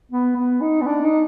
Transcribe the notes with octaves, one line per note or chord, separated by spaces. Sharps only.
B3
B3
D#4
B3
D4
D#4